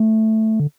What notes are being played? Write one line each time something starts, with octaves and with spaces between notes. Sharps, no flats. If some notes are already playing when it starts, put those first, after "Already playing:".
Already playing: A3
D3